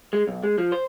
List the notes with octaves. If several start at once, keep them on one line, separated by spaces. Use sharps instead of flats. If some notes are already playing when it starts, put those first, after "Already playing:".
G#3
B1
G#3
F3
C5